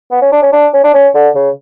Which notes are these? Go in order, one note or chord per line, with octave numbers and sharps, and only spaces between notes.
B3
C#4
D4
C#4
D4
C#4
D4
C#4
D3
C#3